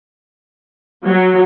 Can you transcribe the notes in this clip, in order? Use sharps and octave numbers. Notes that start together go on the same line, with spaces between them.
F#3